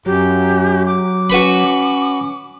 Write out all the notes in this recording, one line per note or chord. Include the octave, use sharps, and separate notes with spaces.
F#2 F#3 G4
D6
C#4 F#4 B4 B5